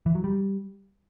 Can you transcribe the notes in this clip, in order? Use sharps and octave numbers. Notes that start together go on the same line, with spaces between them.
E3
F#3
G3